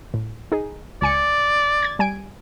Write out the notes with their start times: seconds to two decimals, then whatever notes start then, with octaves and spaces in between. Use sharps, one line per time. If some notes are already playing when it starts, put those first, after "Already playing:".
0.14 A2
0.52 D#4 G#4
1.02 C#2 D5 G#5 C#7
1.82 G#6 A6
1.99 G3 G#5 D7